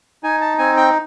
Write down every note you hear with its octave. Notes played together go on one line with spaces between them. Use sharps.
D#4 G#5
A5
C4 G#5
G5